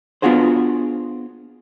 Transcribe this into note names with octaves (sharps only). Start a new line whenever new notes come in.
B3 D4 F4 F#4 G#4 C5